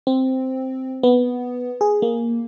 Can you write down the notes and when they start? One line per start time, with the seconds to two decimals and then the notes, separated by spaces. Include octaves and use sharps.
0.07 C4
1.03 B3
1.81 G#4
2.02 A#3